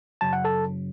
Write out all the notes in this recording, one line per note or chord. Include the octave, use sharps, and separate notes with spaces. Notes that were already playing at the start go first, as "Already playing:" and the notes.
F#2 C#3 F#3 A5
F#5
A4 A5